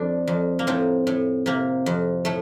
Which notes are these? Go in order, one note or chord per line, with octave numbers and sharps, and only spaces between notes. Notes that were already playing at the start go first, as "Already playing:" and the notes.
Already playing: F2 D4
F2
A#3
A2 C4
A2
C3 A#3
F2
A2 A3